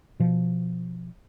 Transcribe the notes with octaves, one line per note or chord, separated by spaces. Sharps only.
B2 F3